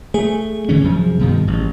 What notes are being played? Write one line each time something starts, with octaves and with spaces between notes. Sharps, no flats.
A3 G#4
D3 E3 C#4
F#2 C3 F3
G2 B2 D#3
A1